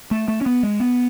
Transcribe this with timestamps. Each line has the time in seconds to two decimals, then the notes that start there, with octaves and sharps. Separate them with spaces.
0.11 A3
0.28 A3
0.41 C#4
0.46 B3
0.63 G#3
0.80 B3